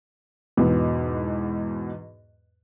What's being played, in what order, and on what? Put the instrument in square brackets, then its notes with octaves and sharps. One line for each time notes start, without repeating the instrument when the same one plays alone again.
[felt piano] E2 G#2 B2 B3